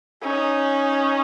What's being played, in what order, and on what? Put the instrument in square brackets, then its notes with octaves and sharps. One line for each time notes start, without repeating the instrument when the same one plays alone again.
[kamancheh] C#4 [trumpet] D#4